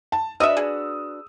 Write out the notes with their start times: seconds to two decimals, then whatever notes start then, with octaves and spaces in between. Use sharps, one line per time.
0.12 A5
0.40 D4 F#4 B4 D#5 E5 D#6 E6
0.57 G#4